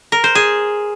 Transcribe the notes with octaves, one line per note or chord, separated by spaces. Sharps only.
A#4
C5
G#4